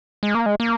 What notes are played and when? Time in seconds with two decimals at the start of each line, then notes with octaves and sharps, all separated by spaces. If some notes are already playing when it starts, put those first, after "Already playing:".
0.23 G#3
0.35 A#3
0.46 G#3
0.60 A#3